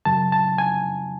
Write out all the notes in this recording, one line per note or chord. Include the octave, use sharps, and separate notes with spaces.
F#2 C#3 F#3 A5
A5
G#5